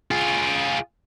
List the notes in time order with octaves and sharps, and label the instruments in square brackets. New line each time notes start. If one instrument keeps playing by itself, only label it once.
[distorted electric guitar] F4 G#4